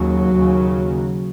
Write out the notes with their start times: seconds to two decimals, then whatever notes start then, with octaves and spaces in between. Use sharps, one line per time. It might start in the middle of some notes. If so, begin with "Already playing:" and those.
Already playing: D#2 C#3 F#3
0.35 D#2 C#3